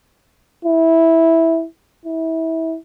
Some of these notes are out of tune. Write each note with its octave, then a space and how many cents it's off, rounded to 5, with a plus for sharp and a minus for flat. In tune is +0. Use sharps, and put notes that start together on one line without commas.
E4 -10
E4 -25